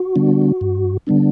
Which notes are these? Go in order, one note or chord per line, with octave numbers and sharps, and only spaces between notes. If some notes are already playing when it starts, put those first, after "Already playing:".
Already playing: F#4
D3 G3 B3 D4
G2
D3 G3 B3 D4